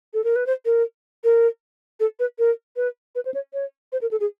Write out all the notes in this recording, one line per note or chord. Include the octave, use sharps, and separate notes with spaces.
A4
A#4
B4
C5
A#4
A#4
A4
B4
A#4
B4
B4
C5
C#5
C#5
C5
A#4
A4
G#4